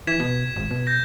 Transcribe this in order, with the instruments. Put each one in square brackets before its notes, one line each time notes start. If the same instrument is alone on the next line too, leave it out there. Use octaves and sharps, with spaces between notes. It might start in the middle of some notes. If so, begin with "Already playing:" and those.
[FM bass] E3 [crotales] G#6 B6 E7
[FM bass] B2
G#1
B2
[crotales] G6 A#6